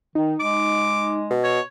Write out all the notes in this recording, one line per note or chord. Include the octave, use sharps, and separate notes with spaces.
D#3 D#4
G#3 D6
B2
C#5